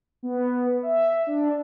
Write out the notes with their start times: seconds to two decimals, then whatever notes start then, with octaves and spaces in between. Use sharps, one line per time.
0.23 B3
0.83 E5
1.27 D4